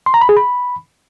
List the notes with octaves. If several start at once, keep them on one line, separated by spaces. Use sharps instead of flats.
C6
A#5
B5
G#4
B5